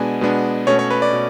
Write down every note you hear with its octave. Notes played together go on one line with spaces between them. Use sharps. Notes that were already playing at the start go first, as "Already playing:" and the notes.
Already playing: B2 G#3 B3 D4 G#5
B2 G#3 B3 D4
B2 A3 C#4 C#5
C#5
B4
D5
B2